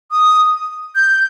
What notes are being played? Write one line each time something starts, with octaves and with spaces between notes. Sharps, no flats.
D#6
G6